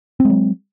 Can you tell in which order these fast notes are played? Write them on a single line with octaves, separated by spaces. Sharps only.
C4 G#3 F#3